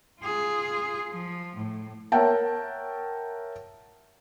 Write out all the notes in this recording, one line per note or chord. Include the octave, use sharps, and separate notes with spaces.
F4 G#4
F3
A2
A#4 C#5 E5 F#5 G5 A5